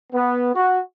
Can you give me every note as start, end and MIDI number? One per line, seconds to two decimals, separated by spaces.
0.13 0.54 59
0.54 0.80 66